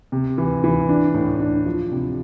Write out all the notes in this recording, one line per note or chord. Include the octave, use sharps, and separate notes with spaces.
C3
E3
E3
D4
A2
D4
F3
C3